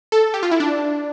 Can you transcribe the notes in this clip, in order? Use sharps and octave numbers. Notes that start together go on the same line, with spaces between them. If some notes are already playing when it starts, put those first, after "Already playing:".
A4
G4
F4
E4
D4